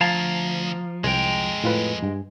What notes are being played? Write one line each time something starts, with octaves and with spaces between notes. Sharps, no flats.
D2 F3 F5 A5 A#5 G#6
C2 F2 G#3 A#4 G5
A2 F4 B4
G2